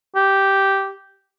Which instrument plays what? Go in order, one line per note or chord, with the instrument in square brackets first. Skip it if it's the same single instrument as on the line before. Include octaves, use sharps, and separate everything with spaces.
[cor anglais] G4